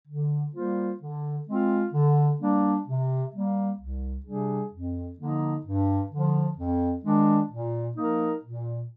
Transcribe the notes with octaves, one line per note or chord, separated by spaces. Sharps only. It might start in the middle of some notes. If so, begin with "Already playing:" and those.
D3
G3 A#3 F4 C5
D3
G#3 C4 F4
D3
G3 A#3 D4
C3
G3 A#3
C2
C3 G3 D4 G#4
F2
D3 F3 A#3 D#4
G2
D3 F3
F2
D#3 G#3 D4
A#2
F3 A#3 D#4 A#4
A#2